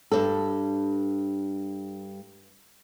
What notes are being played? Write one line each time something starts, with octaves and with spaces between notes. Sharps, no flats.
G2 D4 A4